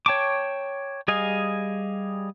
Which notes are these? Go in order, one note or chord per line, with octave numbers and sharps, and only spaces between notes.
C#5 G5 A5 C#6 D6
G3 G#4 D#5 F5 G#5